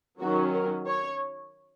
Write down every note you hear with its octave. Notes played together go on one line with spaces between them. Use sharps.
D#3 F#3 C#4 F#4
A#4
C#5